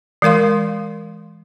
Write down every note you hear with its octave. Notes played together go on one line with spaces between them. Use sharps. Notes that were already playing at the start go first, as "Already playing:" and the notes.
E3 G#3 A#4 F5 C6